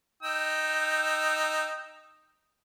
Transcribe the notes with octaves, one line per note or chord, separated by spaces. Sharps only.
D#4 G5 E6